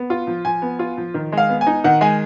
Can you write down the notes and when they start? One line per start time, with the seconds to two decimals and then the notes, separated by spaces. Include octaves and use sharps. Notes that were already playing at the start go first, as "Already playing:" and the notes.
Already playing: B3
0.10 F4
0.27 F3
0.45 F3 G#5
0.62 B3
0.79 F4
0.97 F3
1.14 D#3
1.32 G#3
1.37 F5
1.49 B3
1.61 G#5
1.67 D#4
1.84 D#3 F#5
2.01 G#3 G#5